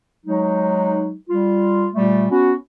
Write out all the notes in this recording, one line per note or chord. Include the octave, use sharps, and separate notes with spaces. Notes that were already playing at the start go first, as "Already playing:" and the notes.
F#3 G#3 D#4
G3 F4
A#2 G3 A3
B3 C#4 F#4